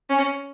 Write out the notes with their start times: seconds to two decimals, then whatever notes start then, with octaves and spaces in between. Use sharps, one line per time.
0.10 C#4